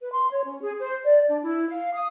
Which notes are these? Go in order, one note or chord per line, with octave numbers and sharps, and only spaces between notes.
B4
C6
C#5
C#4
G#4
C5
D5
D4
E4
F5
D#6